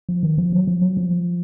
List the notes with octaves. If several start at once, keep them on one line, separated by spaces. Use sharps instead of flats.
F3
D#3
F3
F#3
F3
F#3
F3